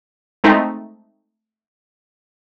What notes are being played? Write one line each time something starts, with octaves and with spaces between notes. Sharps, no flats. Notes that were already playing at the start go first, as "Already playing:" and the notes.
G#3 A3 C4 D#4